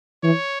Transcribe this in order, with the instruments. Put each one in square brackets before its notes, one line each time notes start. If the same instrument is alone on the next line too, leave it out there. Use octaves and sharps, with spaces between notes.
[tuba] E3 [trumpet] C#5